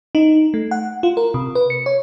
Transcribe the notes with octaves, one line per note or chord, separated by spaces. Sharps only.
D#4
A3
F#5
F4
A#4
C3
B4
C#7
C#5